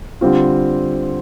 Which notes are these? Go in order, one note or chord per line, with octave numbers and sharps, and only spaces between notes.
D3 G3 C4 F4